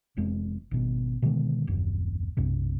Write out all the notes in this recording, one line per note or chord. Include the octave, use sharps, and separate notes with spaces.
F1 F2 G#3
G#1 B2
B2 D3 D#3 G#3
D#1 G#1 F#2
B1 F#2 C3